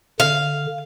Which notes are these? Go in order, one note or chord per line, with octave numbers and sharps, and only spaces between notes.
D3 F5